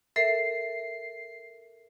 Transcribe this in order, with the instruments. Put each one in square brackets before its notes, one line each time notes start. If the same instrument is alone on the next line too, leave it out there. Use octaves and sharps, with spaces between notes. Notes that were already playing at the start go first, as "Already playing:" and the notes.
[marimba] A4 A#4 E5 [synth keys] C7